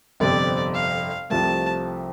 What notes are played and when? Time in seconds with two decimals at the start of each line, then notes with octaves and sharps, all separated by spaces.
0.20 G1 F2 C3 D5
0.74 F5
1.30 C2 C3 F3 A3 A5